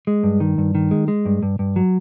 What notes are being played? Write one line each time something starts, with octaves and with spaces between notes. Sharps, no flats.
G#3
G2
D#3
G2
D#3
G#3
G#3
G2
G2
G2
F#3